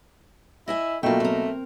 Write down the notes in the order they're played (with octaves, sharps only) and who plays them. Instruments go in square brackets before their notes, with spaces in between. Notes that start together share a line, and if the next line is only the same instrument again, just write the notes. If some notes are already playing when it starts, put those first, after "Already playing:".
[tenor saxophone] E4 [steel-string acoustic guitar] D#5 E5 G#5
[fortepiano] B2 F#3 A#3 [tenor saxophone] A3 [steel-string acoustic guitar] F4 G5
[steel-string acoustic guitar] C4 A#4